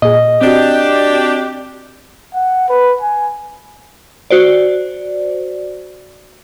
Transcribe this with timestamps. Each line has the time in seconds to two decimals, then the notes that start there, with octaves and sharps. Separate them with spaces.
0.02 A#2 G#4 D#5
0.41 C4 D4 F#4 G4
2.34 F#5
2.69 B4
3.01 G#5
4.31 F#4 C5 D5